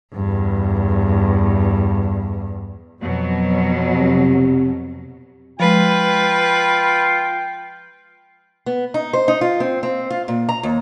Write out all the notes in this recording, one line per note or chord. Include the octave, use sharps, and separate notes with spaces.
E2 G2
F2 B2 F#3
C3
F3 G#3 F4 B4 G5
B3
D#4
C5
D#4
F4
C4
C4
F4
A#2
A#5
D#2